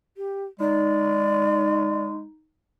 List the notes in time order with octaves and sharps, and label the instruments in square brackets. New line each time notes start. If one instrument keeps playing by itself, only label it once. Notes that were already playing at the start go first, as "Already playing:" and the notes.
[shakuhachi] G4
[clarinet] G#3 [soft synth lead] D#4 [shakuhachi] D5